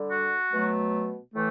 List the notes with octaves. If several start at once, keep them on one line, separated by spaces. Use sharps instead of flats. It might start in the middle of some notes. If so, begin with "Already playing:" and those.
Already playing: D3 G3
F#4
B2 F#3 A3
A2 E3 A3